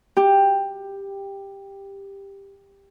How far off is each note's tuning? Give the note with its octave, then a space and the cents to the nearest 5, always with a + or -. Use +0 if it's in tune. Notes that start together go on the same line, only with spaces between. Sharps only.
G4 +10